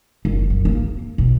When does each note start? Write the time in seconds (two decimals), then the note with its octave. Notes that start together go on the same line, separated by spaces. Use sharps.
0.25 F#1
0.50 F#2
0.65 A#3
1.18 B2